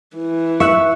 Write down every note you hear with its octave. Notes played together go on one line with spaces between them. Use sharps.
E3
E5 C#6 E6 F#6